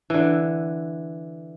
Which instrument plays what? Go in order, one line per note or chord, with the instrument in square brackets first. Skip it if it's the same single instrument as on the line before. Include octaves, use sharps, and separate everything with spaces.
[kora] D3 E3